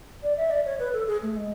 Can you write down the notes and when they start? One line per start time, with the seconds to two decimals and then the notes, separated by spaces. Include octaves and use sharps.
0.23 D5
0.37 E5
0.50 D5
0.65 C#5
0.79 B4
0.93 A4
1.07 G#4
1.23 A3
1.36 G#3